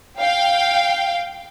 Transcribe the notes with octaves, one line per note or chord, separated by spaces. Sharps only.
F5 G5